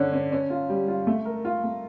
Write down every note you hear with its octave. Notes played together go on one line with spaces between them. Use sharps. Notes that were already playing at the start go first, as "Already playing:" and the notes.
Already playing: D3 C#4
C#4
C#4
F4
G3
F4
A3
A#4
F4
A3